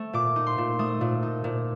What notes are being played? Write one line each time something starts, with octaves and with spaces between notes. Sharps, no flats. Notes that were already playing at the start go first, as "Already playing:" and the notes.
Already playing: A3
A#2 D6
D#4
C6
A#2
A3 D#6
A#2
D#4
A#2